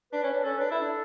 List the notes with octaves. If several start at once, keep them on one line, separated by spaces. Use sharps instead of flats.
D4 B4
C#4
D4
C#4 A4
D4 B4
E4 A4
D4